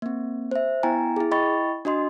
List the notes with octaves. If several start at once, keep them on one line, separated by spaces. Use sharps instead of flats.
A#3 C4
C5 E5
B3 E4 G5 G#5 A#5
E4 G#4
E4 D#5 G5 B5 C#6 A6
D4 F#4 D#5 C6